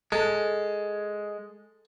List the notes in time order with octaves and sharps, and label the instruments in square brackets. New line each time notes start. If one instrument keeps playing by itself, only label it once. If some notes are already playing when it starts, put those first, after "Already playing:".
[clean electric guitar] G#3 [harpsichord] A4